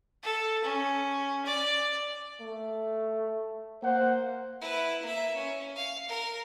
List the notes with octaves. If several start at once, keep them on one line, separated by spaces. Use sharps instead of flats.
A4
C#4
D5
A3
A#3 C5 F#5
E4 B4
A#3 E5
C#4
F5
A#4